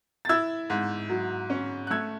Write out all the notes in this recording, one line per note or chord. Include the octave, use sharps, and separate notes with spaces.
A6
E4 E6 G#6
G#2
F#3
C#4
F#6
A3 E6 G#6